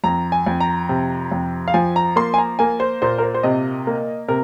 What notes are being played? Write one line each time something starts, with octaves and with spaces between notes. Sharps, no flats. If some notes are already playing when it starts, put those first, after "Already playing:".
F2 A#5
G#5
F2
A#5
C3
F2
F5
F3 G#5
A#5
A#3 C6
G#5
A#5
A#3 G#5
C5
A#2 C5
A#4
C5
C5
C3 D#5
A#3
C3 A#4